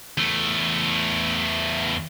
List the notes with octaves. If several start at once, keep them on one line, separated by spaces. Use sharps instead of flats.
E2 A3